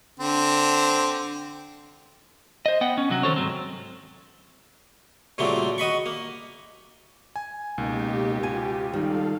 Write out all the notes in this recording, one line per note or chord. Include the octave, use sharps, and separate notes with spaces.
D3 C4
C5 D#5
B3 F#5 G5
C#4
C3 F#3 F#4
D#3 C4 A4 C5 C#5
G#2 F#3 C4
A#2 C#3 F#3 G3 A3 C4
F#4 D#5 B5 C#6
A#3
G#5
C#2 B2 A#3 D#4 G4
B2 F4 G4 G#5
D#3 G3 A4 F5